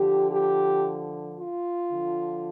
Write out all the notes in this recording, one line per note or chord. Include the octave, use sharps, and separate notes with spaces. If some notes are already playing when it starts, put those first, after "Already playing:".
Already playing: D3 F3 G4
G4
F4
D3 F3